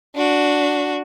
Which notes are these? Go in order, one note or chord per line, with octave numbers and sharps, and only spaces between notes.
D4 F#4